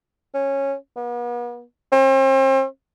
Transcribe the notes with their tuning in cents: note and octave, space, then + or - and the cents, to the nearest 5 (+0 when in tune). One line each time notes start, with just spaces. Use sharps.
C#4 -15
B3 -40
C4 +40